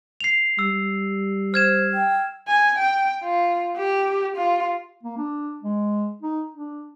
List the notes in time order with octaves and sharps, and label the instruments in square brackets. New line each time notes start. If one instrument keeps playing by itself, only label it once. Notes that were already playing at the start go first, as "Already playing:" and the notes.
[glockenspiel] C7 F7
[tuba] G3 [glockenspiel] E6
[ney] C5 [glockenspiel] F6 G#6 E7
[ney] G5
[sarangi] G#5
G5
F4
G4
F4
[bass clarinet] A#3
D4
G#3
D#4
D4